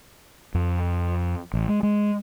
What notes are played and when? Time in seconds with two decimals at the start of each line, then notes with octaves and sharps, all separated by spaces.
0.55 F2
1.54 A1
1.68 G#3
1.83 G#3